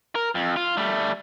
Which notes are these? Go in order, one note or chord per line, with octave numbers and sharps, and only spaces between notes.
A#4
F2
F4
G3 A3